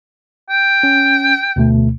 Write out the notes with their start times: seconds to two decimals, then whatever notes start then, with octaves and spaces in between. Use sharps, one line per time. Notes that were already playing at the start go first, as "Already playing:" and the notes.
0.49 G5
0.83 C#4
1.56 D2 B2 A3